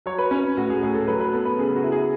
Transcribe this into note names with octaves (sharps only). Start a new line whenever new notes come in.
F#3 C#5
B4
C#4 B4
A2 F#4
G#4
A2 G#4
A4
F#3 B4
B4
B3 A4
B4
C#3 G#4
F#4
E4
G#4